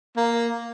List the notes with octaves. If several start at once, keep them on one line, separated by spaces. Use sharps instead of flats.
A#3